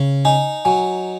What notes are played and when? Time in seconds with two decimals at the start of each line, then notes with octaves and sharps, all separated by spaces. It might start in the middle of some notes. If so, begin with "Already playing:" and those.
Already playing: C#3
0.25 D#4 G#5
0.65 F#3 G#5